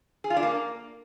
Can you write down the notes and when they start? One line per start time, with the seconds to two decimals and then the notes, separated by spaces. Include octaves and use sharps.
0.24 G#4
0.30 F4
0.37 D4
0.43 A#3